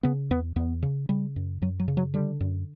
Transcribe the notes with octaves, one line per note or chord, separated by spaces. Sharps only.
C#3 B3
E2 B3
E2 B3
C#3
C#3 G3
F#2
F#2 F#3
F#3
C#3
F#3
D3 G3
F#2